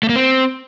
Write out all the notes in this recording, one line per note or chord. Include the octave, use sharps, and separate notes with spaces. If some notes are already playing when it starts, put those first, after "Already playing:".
A3
A#3
C4